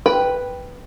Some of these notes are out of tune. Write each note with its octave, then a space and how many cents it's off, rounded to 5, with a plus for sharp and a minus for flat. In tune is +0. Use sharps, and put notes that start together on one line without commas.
B4 +0 G5 +0